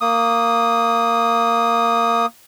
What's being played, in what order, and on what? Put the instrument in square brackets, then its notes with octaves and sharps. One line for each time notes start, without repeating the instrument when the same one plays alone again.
[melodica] A#3 D#6